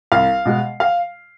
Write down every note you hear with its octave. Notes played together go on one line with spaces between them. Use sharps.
C2 F5
B2 G#3
F5